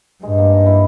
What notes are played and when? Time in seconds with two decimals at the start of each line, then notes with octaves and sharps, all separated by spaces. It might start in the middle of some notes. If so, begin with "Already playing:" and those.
0.23 G2 G#3
0.38 A#3
0.53 D#4
0.66 E4